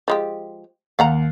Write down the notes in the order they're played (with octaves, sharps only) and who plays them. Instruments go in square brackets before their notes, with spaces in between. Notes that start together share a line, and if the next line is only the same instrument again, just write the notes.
[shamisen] F3 G#3 G4
[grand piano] D#2 [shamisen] F5 F#5 A#5